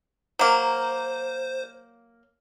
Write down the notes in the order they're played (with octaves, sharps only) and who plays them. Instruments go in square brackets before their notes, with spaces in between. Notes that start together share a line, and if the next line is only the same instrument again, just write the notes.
[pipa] F#3 A#3 [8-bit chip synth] C5